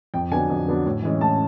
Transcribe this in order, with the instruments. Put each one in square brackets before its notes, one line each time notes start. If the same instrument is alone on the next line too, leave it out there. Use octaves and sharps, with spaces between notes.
[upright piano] F2 G5
D3 F#3 B3 D4 G#5
F2
D3 F#3 B3 D4
A2
E3 G#3 C#4
A2 A5